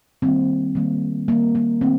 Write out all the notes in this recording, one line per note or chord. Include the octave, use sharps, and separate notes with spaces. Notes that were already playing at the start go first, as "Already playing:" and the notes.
D#3 G3 A#3 C4
D#3 G3 A#3
D#3 G3 A#3
A#3
D#3 A3 C4